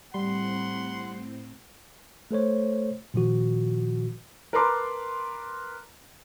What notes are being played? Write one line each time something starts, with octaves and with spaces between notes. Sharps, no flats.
A2 G3 C4 F#5 C6
A3 A4 C5 C#5
A#2 D#3 F3 F#4
A#4 B4 A5 A#5 C6 D6